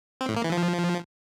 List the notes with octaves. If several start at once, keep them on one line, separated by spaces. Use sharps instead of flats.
C4
A2
A#3
E3
F3